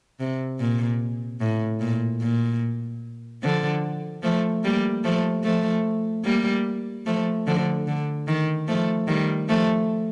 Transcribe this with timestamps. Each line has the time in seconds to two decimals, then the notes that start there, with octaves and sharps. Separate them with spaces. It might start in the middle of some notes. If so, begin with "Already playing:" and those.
0.20 C3
0.60 A#2
1.41 A2
1.80 A#2
2.21 A#2
3.43 D3 F3
4.23 F3 A3
4.63 G3 A#3
5.04 F3 A3
5.44 F3 A3
6.25 G3 A#3
7.06 F3 A3
7.47 D3 F3
7.88 D3
8.28 D#3
8.68 F3 A3
9.08 D#3 G3
9.48 F3 A3